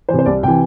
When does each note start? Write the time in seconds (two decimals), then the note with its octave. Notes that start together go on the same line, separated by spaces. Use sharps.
0.09 C3 E3 C5
0.19 C5
0.26 C2 D5
0.43 C3 E3 G5